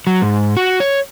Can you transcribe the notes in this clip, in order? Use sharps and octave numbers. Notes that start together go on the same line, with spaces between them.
F#3
G#2
F#4
C#5